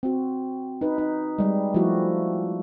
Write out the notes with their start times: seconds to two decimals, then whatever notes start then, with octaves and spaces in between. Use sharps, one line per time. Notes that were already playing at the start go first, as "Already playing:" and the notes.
0.03 C4 F#4
0.81 D#4 B4
0.98 D#4
1.39 G3 G#3
1.74 F3 G3 A3 E4 F#4 G4